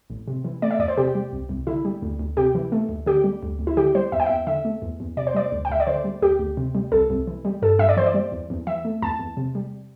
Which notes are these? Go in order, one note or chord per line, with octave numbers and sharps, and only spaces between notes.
A1
C3
E3
A3 D5
E5
E2 D5
C5
C3 G4
G3
C2
C2
D3 E4
G3
D2
D2
C3 G4
E3
A3
D2
D3 G4
G3
D2
D2
E4
D3 G4
G3 C5
E2 E5
G5
E2 E5
D3 E5
A3
E2
E2
C3 D5
C5
G3 D5
D2
G5
D2 E5
D5
D3 C5
G3
D2 G4
D2
C3
G3
C2 A4
C2
E3
G3
G2 A4
G2 E5
D5
E3 C5
D5
G3
E2
E2
E3 E5
A3
E2 A5
E2
C3
G3